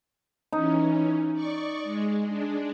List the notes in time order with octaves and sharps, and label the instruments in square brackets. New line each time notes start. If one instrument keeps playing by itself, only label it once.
[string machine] E3 C#4 [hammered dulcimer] D#4
[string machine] D5 C#6
G#3
G#3 D4